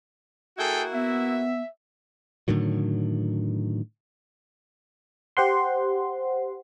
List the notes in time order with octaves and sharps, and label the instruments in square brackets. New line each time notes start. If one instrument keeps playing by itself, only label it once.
[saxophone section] A#3 E4 F#4 [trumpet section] G#4 A4 G5
[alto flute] B3 [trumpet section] E5
[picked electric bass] A2 D3 D#3 F#3
[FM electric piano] G4 C5 F#5 C6